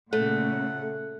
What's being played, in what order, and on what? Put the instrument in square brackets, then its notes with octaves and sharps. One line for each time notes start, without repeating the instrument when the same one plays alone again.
[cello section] A#2 C#3 [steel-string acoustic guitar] A3 [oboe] F#5